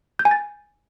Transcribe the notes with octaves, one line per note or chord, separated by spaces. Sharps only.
G6
G#5
A6